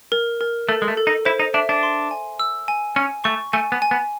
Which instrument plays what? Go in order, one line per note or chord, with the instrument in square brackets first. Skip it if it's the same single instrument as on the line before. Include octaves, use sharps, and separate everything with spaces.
[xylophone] A#4
A#4
[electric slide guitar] A3 [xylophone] A4
[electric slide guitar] G#3
A3
[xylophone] A4
[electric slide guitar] D#4
[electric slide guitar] E4 [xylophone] C5
[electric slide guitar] D#4
[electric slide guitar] D4 [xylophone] E5
[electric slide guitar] D4
[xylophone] C6
G#5
E6
G#5
[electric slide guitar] C#4 [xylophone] G#5
[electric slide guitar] A3 [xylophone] C#6
[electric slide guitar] A3 [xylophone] G#5
[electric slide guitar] B3
[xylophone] G#5
[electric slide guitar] B3